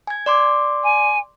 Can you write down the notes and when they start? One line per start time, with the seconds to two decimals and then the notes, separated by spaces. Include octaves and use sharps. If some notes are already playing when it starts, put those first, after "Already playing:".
0.07 G#5 G#6
0.26 D5 C6 D6
0.84 G#5